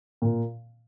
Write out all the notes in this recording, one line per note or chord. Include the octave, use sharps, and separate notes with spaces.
A#2